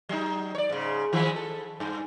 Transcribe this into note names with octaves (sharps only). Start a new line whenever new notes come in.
F#3 D#4
C#5 D5
G#2 C#3
D#3 F3 G#3
A4
G2